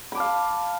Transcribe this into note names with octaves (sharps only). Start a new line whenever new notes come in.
F5 A5 B5 D6